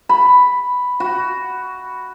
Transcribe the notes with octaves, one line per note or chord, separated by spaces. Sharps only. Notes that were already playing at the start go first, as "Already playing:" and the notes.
B5
F#4